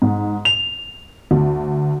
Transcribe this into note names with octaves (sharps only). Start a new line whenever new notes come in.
G#2
F7
D2